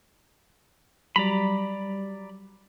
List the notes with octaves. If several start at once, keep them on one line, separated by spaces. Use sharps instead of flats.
F#3 G3 D5 A#5 B5